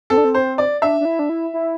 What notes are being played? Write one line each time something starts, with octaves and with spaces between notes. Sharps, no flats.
C4 A4
D4
C4
C5
D5
D4 E5
D4
E4
D4
E4
E4